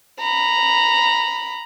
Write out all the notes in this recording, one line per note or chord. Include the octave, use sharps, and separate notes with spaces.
A#5 B5